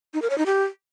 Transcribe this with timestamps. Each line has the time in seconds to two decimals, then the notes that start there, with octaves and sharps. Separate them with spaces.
0.14 D#4
0.22 A#4
0.30 C#5
0.38 D#4
0.46 G4